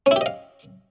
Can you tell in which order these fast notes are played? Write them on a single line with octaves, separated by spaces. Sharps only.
C#4 E4 G4 D#5 F5